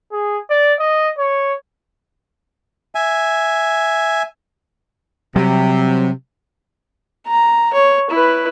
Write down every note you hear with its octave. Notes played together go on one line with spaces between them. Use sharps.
G#4
D5
D#5
C#5
E5 G#5
C3 F#3 G3
A#5
C#5
E4 B4